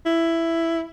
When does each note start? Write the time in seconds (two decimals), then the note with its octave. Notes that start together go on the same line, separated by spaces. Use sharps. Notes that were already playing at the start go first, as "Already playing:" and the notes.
0.06 E4